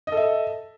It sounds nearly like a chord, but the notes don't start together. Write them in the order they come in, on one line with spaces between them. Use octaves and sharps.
D#5 A4 E5